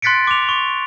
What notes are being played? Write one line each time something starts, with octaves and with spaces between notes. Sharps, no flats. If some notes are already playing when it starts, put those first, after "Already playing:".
C6 F#6 A6 B6 C#7 D7
D6 F7
C#6